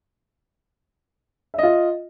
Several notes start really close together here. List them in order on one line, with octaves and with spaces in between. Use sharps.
E5 D#5 F4